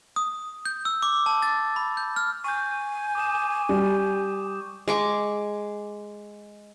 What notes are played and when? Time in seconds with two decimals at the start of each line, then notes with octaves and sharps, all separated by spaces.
0.16 D#6
0.65 G6
0.85 E6
1.03 D6
1.26 A5
1.42 A6
1.76 B5
1.97 G6
2.16 F6
2.44 G#5 C#6 G6
3.15 D6 D#6 E7
3.69 G3
4.88 G#3 C#6 D6